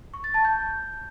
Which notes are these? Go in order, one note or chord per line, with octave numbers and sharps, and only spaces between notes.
C#6
A6
A5
G6